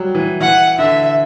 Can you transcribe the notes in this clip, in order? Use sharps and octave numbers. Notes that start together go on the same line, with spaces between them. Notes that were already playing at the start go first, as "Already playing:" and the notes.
Already playing: F#3 G3
E3
E3 F#5
D3 E5